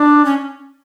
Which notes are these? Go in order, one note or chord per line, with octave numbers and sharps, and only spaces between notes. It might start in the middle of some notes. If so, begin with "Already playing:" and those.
Already playing: D4
C#4